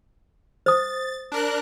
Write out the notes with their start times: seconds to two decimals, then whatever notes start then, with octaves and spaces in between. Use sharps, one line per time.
0.66 C5 D#6 A6
1.32 D4 A#4 F#6